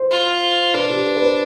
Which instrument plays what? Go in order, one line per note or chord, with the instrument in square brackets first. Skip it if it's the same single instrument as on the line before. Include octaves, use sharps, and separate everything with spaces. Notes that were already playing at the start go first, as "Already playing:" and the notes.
Already playing: [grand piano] C5
[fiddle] F4
[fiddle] D4 [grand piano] B4
[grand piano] G4
B4
B4
C5